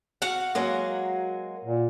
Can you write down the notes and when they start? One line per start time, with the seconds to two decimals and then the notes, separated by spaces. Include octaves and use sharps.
0.22 F#4 F5 F#5
0.55 F#3 G#3 A#3
1.65 A#2